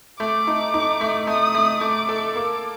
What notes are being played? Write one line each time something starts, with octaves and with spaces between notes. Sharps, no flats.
A3 D6
D#4
D#4
A3
A3 D#6
A3
A3 D6
A4
A#3 D6